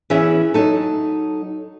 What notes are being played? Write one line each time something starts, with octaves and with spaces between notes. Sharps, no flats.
E3 B3 C#4 E4 G#4 E5
F#3 D#4 A4